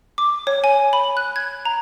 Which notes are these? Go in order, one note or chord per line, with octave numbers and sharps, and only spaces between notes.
D6
C#5
G#5
B5
F#6
G#6
A#5